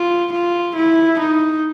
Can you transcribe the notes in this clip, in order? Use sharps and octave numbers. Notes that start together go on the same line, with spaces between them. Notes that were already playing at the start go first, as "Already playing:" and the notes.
Already playing: F4
F4
E4
D#4